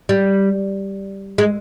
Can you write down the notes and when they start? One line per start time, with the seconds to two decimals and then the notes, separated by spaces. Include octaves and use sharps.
0.09 G3
1.38 G#3